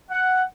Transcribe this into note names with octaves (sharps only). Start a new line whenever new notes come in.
F#5